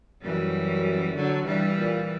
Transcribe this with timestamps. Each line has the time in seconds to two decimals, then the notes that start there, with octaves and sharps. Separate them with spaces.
0.23 F#2 E3 G3
1.15 D3 F#3
1.46 G2 E3 G3
1.77 A#2